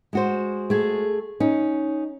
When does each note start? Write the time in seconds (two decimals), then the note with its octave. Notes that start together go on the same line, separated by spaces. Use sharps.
0.13 G#3 F#4 C5
0.70 A3 G#4
1.40 C#4 D#4